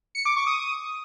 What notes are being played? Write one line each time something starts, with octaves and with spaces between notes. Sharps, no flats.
C#7
D6
C#6
D#6
D#6